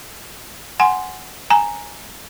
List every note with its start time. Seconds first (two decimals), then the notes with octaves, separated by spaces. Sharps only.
0.80 F#5 G#5 C6
1.50 G#5 A#5